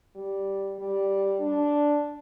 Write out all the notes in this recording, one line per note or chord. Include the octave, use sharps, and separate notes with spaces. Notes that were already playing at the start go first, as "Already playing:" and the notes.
G3
G3
D4